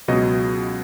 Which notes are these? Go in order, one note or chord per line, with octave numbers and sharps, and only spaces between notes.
C#2 B2 F#3 D#5